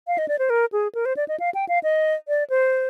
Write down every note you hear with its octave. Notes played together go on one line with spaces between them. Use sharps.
F5
D#5
D5
C5
A#4
G#4
A#4
C5
D5
D#5
F5
G5
F5
D#5
D5
C5